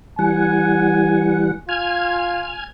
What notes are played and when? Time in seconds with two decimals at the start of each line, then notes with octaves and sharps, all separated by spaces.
0.19 E3 G3 F#5 G#5
1.69 F4 G#5 F6 G#6